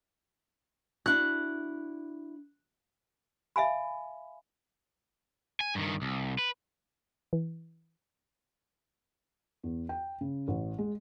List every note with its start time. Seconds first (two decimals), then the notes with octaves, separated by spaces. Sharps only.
1.06 D4 E4 F#4 F#6
3.56 E5 F5 G#5 B5
5.60 G#5
5.75 G2 D#3
6.02 C2
6.39 B4
7.33 E3
9.63 E2
9.89 G5
10.21 C#3
10.48 A1
10.78 G#3